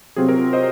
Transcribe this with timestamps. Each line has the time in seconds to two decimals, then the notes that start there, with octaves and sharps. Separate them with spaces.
0.16 C3 F#3 C4 F4 G#4
0.29 A#4
0.53 C5 D#5